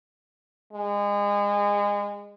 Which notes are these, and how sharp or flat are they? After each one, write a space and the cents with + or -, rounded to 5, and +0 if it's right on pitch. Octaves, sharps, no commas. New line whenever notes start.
G#3 -30